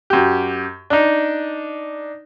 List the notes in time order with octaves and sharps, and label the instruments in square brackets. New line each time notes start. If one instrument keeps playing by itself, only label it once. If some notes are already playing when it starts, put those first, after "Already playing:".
[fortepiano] F#2 G4
D4 D#4